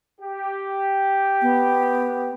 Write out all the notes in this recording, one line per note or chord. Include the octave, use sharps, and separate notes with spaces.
G4
B3